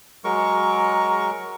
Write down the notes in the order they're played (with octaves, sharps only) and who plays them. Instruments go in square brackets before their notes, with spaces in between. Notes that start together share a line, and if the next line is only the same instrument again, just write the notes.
[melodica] F#3 G#3 A#4 C#6